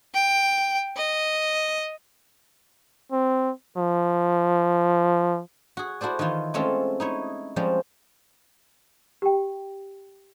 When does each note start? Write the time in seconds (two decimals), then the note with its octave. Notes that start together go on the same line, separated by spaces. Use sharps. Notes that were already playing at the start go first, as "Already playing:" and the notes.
0.14 G5
0.97 D#5
3.12 C4
3.77 F3
5.77 F#4 G#4
6.01 E4 F#4 A4 C5 D5
6.19 D#3 E3 E4 F4
6.54 G#3 A3 C4 C#4 F4 A4
7.00 D#4 E4 C#5
7.56 F3 G3 G#3 C4 C#4
9.22 G4 G5